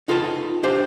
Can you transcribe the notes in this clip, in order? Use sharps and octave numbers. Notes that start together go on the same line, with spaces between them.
D#4 F4 A4 B4 F5 A5
D4 G4 C5 F5